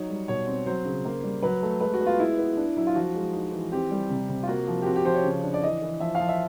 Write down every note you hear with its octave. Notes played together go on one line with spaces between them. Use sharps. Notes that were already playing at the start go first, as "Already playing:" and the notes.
Already playing: F#3 D#4 C#5
G3
B2 C#5
C4
F#3 C5
C#3
A#3
G3
F#3 B4
A3
G#3 B4
F#4
B3
F4
G#3 E4
B3
D4
F#3 E4
F4
F3 F#4
G#3
D#4
E3
C4 G4
G3
C3
C3
F4
A#3 F#4
F3
G4
C4 F#4
G4
F3 C5
C#5
C#3
D4
D5
E3 D#5
E3
F3 E5
F5
F3
E5